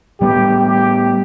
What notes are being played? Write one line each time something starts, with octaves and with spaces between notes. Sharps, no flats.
A2 G3 B3 G4
G4